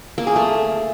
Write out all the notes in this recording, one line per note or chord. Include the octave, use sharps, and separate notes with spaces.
A#3
G#4
A3